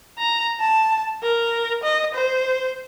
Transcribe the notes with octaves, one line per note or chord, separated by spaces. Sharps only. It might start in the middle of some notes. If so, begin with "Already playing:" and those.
A#5
A5
A#4
D#5
C5